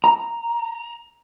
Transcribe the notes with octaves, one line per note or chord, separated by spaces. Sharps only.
A#5